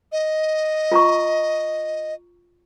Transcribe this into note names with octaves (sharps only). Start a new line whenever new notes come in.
D#5
F4 A#5 C#6